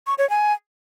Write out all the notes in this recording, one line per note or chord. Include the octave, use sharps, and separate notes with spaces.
C#6
C#5
G#5